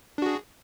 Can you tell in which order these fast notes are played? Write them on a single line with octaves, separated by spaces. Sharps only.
D4 F#4 G#4